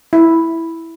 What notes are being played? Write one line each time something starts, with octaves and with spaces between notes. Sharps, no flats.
E4